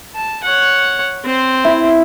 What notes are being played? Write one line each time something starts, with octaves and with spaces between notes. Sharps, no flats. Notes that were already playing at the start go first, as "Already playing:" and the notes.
A5
C#5 F#5
C4 C5
E4